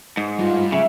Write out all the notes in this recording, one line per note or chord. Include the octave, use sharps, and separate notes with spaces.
G#2
G2 F4
C#3 E5